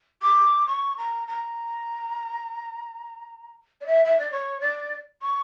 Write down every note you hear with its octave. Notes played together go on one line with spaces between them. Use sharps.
D6
C#6
A#5
A#5
D5
E5
E5
D5
C#5
D5
C#6